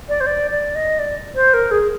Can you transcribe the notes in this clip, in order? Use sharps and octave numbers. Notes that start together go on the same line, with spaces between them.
D5
C5
D5
D5
D#5
D5
C5
A#4
G#4